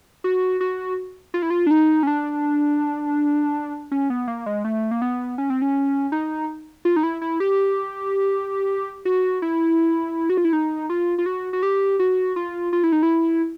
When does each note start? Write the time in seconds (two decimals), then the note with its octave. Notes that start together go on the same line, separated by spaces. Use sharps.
0.24 F#4
0.61 F#4
1.34 F4
1.42 E4
1.50 F4
1.67 D4
1.71 D#4
2.03 C#4
2.07 D4
3.92 C#4
4.10 B3
4.27 A#3
4.46 G#3
4.64 A3
4.91 A#3
5.02 B3
5.38 C#4
5.50 C4
5.62 C#4
6.12 D#4
6.85 F4
6.96 D#4
7.03 E4
7.22 E4
7.40 G4
9.05 F#4
9.42 E4
10.30 F#4
10.37 F4
10.45 E4
10.53 D#4
10.90 F4
11.18 F4
11.26 F#4
11.53 F#4
11.63 G4
11.99 F#4
12.36 F4
12.73 F4
12.83 E4
12.92 D#4
13.03 E4